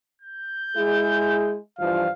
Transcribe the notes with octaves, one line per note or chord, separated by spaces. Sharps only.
G6
G#3 E4 G#4
G2 E3 F3 F5